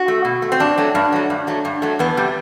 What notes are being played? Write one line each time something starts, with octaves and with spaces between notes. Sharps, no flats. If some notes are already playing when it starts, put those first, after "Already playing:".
Already playing: F#4
A3
B2
A3
C4
G2 D4
F#3 A3
G2
F#3 A3
G2
F#3 A3
G2
F#3 A3
E2 B3
C3 G3